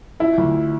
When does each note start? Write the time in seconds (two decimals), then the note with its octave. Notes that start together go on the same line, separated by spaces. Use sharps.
0.20 F3 E4
0.38 D2